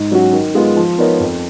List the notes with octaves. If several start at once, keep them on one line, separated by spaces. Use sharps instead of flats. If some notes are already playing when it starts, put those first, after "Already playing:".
Already playing: G#2
F#3 C#4 F#4
D#3
G#3 B3 F4
F3
B3 D#4 A#4 C#5
F2